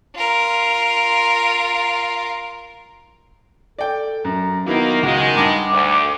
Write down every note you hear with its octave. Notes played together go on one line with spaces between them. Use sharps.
F4 A#4
A4 D5 G5
F#2 A#5
D#3 F#3 A#3 B3 E4 B4
C#2 D#3 F#3 G#3 F#5
G2 A5 D6
D2